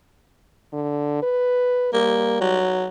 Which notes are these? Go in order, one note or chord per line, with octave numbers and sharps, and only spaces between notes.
D3
B4
G3 A#3
F#3